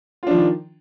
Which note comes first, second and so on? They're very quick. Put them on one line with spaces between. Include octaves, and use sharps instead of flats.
F4 D4 F3 D#3